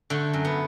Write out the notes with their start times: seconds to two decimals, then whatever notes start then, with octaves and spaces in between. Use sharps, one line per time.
0.10 D3 A3
0.33 F#2
0.45 B3